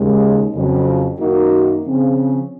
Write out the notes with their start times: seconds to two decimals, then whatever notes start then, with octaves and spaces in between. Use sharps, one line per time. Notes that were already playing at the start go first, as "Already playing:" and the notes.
Already playing: D#2 C#3 G#3
0.54 F2 C#3 F#3
1.19 F#2 D#3 A#3 D#4 F#4
1.84 C#3 F3 C4